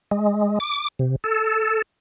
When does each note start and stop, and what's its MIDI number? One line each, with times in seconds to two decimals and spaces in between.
0.11 0.59 56
0.60 0.88 86
0.99 1.16 48
1.24 1.82 69